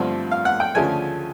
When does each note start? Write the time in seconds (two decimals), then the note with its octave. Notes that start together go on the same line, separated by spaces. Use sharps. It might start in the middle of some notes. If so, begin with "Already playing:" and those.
Already playing: G2 D3 F3 A3 C4
0.31 F5
0.45 F#5
0.60 G5
0.75 D2 C#3 F3 A3 D4 G#5